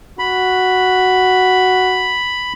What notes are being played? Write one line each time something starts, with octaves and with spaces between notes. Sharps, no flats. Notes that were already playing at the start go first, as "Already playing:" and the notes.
F#4 B5